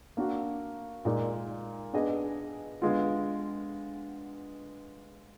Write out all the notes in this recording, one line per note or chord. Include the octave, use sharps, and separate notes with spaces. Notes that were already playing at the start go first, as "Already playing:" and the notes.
A#3 D4 F#4
A#2 G#3 D#4 A#4 D5
B3 D4 G#4 D#5
D3 G#3 B3 F4